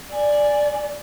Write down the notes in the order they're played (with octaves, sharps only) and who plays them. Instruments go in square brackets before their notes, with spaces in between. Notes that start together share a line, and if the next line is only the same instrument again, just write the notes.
[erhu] D5 [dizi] G#5